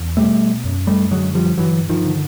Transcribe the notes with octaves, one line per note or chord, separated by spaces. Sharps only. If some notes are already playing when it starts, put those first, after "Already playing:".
Already playing: E2
B2 G3 A3
F#2
G3 A3
D3 F#3 G#3
F3 G3
G2 E3 F#3
D#3 F3
D3